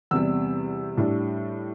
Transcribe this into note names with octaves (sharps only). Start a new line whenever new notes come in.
E2 C3 G3 E6
A2 G3 D4